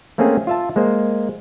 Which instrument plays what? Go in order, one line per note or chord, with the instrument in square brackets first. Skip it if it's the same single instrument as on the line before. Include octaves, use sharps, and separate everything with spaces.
[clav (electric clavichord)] A3 A#3 C4 C#4 G#4
F4 E5 A5
G#3 A#3 C5